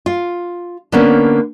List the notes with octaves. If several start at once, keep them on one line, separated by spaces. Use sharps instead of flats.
F4
D3 A#3 B3 C#4